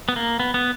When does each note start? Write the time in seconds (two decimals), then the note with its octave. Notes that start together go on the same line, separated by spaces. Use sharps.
0.09 B3
0.16 A#3
0.40 B3
0.54 B3